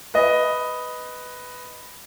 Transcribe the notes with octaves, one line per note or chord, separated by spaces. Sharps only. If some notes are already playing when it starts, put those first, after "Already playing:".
B4 D#5